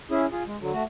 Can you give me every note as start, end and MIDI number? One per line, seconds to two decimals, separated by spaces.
0.11 0.26 61
0.11 0.26 64
0.11 0.26 68
0.32 0.43 65
0.32 0.43 68
0.47 0.57 56
0.61 0.72 50
0.61 0.72 54
0.73 0.84 57
0.73 0.84 66